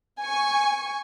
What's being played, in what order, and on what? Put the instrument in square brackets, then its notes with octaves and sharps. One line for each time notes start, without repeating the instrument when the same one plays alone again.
[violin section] G#5 C#6